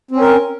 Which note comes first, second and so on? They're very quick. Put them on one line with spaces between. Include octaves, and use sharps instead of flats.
C4 C#4 A#4